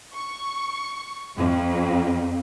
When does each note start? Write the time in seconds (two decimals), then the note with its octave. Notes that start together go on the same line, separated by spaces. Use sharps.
0.13 C#6
1.36 F2